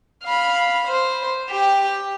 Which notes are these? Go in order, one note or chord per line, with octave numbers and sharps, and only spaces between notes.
F5 B5
C5
G4 G5